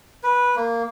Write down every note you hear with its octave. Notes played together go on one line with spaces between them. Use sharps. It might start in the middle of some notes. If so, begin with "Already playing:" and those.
B4
A#3